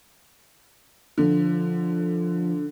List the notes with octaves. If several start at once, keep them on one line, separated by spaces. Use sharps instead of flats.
D3 F3